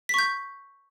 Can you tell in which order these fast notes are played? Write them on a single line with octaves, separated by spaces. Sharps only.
B6 C#6 G6